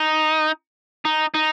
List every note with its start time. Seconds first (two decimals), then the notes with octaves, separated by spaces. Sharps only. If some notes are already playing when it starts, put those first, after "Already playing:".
Already playing: D#4
1.05 D#4
1.34 D#4